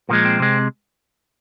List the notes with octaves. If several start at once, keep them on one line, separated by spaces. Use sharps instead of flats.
A#2 F3 G#3 A#3
C4
C3 G#3